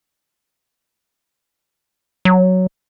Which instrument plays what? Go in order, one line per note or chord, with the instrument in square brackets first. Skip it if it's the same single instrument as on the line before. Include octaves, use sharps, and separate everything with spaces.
[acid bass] F#3